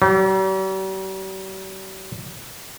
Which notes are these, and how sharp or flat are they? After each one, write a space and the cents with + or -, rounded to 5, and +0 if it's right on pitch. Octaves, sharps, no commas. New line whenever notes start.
G3 -45